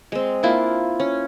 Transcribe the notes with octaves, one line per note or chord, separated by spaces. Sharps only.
G#3 C4
A#3 D4 E4 F4
C#4